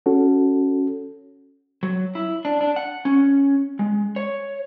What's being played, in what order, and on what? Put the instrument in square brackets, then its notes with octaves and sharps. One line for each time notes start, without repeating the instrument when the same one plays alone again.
[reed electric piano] C#4 F#4 A4
[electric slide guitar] F#3
E4
D4
D4
F#5
C#4
G#3
C#5